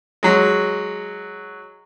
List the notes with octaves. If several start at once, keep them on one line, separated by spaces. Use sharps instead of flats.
F#3 G#3